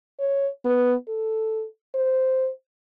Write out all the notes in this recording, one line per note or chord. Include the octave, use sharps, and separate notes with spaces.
C#5
B3
A4
C5